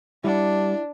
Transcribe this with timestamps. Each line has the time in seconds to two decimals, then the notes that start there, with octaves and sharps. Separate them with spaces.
0.24 G3 D4 E4 F#5